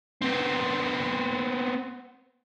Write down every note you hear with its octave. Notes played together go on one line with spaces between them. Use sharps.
B3 C4